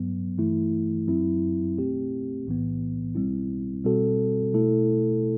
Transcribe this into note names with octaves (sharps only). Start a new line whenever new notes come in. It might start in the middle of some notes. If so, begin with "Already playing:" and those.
Already playing: G2 F#3 B3
G2 E3 A3 E4
F#2 F#3 C4 E4
B2 A3 C4 G4
B1 A2 E3 B3
B1 B2 G3 C4 E4
B2 G3 C4 F#4 A4
B2 A3 E4 A4